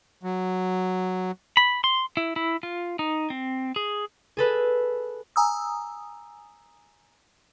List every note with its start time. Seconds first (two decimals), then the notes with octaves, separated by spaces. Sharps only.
0.23 F#3
1.57 B5
1.84 C6
2.17 E4
2.36 E4
2.63 F4
2.99 D#4
3.30 C4
3.76 G#4
4.37 G#4 A4 B4
5.36 G#5 A#5 D#6 E6